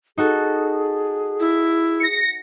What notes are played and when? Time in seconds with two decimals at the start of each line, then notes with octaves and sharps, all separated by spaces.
0.18 D#4 F#4 G#4 A4
1.40 E4
2.00 A#6 C#7